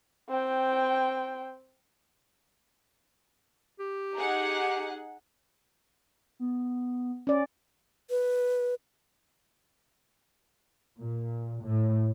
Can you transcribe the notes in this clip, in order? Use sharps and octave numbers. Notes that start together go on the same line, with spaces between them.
C4 G5
G4
D#4 G#4 F#5
B3
C#4 D5
B4
A#2
A2